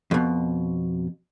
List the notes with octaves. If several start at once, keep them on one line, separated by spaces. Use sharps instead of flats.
F2 B2